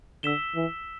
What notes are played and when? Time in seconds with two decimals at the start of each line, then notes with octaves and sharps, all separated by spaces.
0.23 D3 E6 B6 E7 G7
0.55 E3